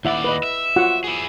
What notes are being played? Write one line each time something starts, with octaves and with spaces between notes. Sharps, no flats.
D#2 E4 D5 E5 F#5
B4 D#5
E5
F4 F#4 F#5
E4 G#4